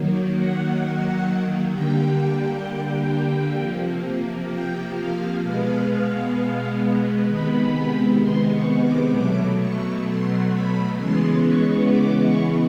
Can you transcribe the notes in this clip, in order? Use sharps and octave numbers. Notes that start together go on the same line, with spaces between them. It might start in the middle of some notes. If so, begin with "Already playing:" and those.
Already playing: D#3 F#3 A#3
F#5
D3 G3 A#3 G5
C3 F3 A#3
G5
F5
B2 G#3 B3 F5
C3 D#3 G#3 B3 B5
C6
C#6
D6
B2 F#3 A3 D6
C#6
C6
B5
C#3 E3 G#3 B3 C6
C#6
D6
C#6